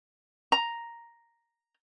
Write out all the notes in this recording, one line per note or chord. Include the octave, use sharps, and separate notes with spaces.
A#5